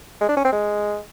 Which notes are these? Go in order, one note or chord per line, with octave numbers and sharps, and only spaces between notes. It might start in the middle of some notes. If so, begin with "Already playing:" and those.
G#3
D4
C#4
C4
G#3